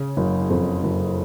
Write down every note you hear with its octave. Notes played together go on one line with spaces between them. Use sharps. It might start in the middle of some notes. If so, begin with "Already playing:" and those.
Already playing: C#3
F#1
F2
F#1